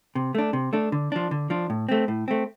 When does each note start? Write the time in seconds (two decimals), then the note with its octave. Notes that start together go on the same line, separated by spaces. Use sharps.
0.15 C3
0.35 A3 D4
0.53 C3
0.73 A3 D4
0.92 D3
1.12 F3 D4
1.31 D3
1.50 F3 D4
1.70 A2
1.89 A3 C4
2.08 A2
2.28 A3 C4